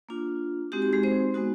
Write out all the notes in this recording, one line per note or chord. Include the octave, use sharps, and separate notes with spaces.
A#3 D4 F4
G#3 C4 D#4 F#4 G4
G4
G#3 G#4
C4 C5
G#3 B3 D#4 F#4